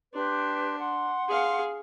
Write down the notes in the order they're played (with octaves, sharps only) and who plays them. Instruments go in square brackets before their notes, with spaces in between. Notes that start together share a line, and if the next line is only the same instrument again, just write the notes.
[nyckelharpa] D4 [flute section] G4 B4 C6
[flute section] F#5 C6
[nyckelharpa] G#4 F5